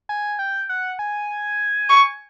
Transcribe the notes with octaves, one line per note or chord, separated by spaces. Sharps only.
G#5
G5
F#5
G#5
C#6